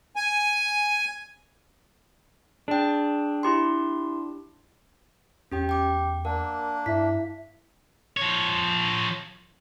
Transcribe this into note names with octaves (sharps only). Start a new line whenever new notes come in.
G#5
D4 G#4 G5
E4 G4 C6
E2 C#4 G4 G5
G5 D6
A#3 D4 A#4 F#5
G2 E4 E5 B6
F3 C#5